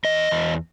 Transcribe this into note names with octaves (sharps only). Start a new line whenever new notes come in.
E2 D#5
E2